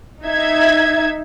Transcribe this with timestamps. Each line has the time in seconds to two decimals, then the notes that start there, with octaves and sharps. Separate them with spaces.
0.24 D#4 E5 G#6